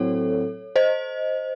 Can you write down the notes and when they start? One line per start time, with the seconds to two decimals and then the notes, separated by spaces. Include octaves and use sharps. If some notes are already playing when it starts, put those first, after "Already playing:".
Already playing: A2 F#3 C4 A4 C#5
0.76 C5 D#5